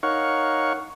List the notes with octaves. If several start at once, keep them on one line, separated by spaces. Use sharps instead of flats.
D#4 A#4 C#5 F5 F#5 C#6